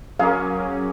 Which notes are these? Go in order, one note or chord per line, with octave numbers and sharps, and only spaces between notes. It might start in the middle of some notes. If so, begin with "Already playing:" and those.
F#3 A#3 C#4 G#4 F5